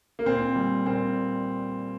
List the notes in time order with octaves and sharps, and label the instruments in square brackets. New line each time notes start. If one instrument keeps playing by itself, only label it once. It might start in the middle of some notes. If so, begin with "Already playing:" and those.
[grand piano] A#3
A#2 C4
G3
A#2 C4